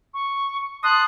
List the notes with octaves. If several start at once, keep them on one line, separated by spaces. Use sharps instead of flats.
C#6
A5 C6 D#6 F#6